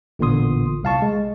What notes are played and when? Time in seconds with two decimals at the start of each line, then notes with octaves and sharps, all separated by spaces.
0.19 A1 A#2 D3 B3 C6 D#6
0.83 C2 F5 A5 C#6
1.02 G#3